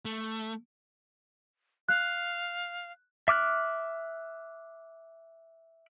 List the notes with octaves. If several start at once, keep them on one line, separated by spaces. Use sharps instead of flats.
A3
F5 F#6
E5 D6 F6 F#6